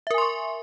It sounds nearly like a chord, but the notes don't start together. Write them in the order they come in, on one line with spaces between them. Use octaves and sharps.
E5 A#4 G#5 C6 C#6